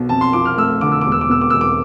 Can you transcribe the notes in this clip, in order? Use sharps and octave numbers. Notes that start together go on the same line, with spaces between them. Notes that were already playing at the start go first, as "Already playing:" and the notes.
Already playing: B1 B2
F2 A5
C6
F3 D6
F6
A3 E6
D3 D6
E6
E1 D6
E6
D6
B2 E6
D6
E1 E6
D6